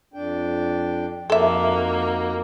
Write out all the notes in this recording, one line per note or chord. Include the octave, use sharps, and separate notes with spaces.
F2 D4 G5
F2 A#3 D#4 F#4 A4 E5